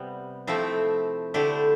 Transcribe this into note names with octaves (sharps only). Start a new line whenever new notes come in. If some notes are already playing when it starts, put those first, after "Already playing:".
Already playing: C3 G3 B3
C3 F3 A3 C4 E4
D3 A3 E4 G4